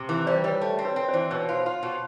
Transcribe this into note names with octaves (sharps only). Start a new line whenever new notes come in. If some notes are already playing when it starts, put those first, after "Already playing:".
Already playing: C3
E3
G3 C5 D5
G3 B4 C#5
A3
C4
B4 C#5
C4
C5 D5
E3
B2 B4 C#5
F4
C5
F4
B2